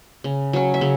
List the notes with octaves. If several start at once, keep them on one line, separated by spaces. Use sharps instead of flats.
C#3
F#3 C#4
E5
C#3